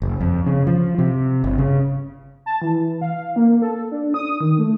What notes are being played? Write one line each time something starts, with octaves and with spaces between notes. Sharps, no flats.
F#1
F2
C#3
F3
C3
G1
C#3
A5
E3
F5
A#3
A4
D4
D#6
D#3
A3